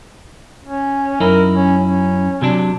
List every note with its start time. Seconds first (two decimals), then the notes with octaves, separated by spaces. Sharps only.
0.63 C#4
1.20 F#2 D#4 E4 A#4
1.55 C#4
1.82 C#4
2.42 C3 F#3 D4